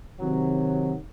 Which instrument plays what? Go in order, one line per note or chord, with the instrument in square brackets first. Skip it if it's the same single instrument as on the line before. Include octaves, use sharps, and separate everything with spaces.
[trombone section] C3 D#3 F#3